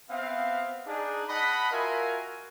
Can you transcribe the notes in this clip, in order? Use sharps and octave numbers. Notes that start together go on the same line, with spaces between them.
B3 C4 E5 F5
D4 D#4 G#4
D#5 F#5 A5 B5
F4 F#4 A#4 E5 F5 G#5